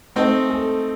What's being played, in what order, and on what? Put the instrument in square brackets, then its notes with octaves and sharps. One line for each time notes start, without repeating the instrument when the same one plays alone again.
[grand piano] A3 [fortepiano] C4 D#4
[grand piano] A4